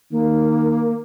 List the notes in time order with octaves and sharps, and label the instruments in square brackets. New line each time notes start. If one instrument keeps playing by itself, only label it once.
[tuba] D#3 [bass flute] A#3